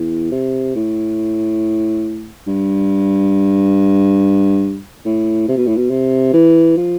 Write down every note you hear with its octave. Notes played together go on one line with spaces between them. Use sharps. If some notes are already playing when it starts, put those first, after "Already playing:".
Already playing: E2
C3
A2
G2
A2
C3
B2
A2
B2
C3
E3
F3